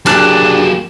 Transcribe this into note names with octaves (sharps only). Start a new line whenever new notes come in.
F#3 A#3 D4 G4 G#4 D5 F#6 E7